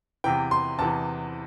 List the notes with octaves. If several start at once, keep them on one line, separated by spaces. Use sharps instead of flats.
E2 C3 E3 G5
C6
E2 C3 E3 A5